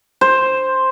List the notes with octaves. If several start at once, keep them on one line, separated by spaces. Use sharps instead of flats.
C5